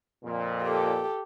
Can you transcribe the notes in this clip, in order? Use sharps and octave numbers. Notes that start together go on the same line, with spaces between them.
F2 A#2
G4 A4